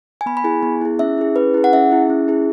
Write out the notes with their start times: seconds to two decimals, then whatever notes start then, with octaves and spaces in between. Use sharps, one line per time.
0.21 G#5
0.26 B3 B5
0.37 B5
0.44 E4 G#4 G#5
0.63 B3
0.81 E4 G#4
0.99 C#4 E5
1.18 E4 G#4
1.36 C#4 B4
1.54 E4 G#4
1.64 F#5
1.73 C#4 E5
1.91 E4 G#4
2.09 C#4
2.28 E4 G#4